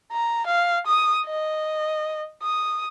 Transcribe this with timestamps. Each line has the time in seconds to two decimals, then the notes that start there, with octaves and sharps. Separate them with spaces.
0.12 A#5
0.47 F5
0.87 D#6
1.26 D#5
2.43 D#6